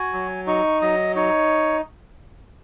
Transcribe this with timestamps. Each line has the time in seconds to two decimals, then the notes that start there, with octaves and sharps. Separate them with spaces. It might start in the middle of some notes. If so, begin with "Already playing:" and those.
Already playing: F#4 G#5
0.13 F#3
0.47 D#4 C#6
0.81 F#3 D#5
1.16 D#4 C#5